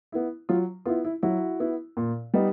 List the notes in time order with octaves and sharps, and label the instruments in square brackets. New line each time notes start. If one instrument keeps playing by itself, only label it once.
[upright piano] B3 E4
F#3 F4
B3 E4 F4
E4
F#3 E4 F#4
B3 E4
A#2
G3 B3 D#4